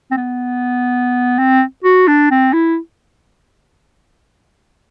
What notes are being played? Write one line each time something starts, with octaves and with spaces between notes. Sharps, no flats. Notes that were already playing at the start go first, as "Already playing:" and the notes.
C4
B3
C4
F#4
D4
C4
E4